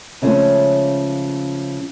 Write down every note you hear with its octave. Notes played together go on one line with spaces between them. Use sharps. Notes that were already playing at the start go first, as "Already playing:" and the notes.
C#3 F3 G#3 A3 C#4